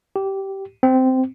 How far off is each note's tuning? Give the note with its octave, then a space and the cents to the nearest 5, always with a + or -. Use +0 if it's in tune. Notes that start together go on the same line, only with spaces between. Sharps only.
G4 -15
C4 -15